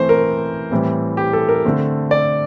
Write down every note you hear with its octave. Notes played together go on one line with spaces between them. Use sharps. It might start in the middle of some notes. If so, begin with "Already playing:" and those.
Already playing: E3 A3 C4 C5
A#4
A2 E3 G3 C4
G4
A4
A#4
D3 A3 C4
D5